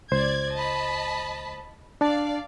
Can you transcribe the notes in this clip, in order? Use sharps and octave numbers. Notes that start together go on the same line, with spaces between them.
C#2 C5 D5 G#6
D#5 A5 B5
D4 D5 F5 A5